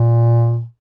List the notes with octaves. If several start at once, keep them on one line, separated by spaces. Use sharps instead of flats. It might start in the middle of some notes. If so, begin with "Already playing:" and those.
Already playing: A#2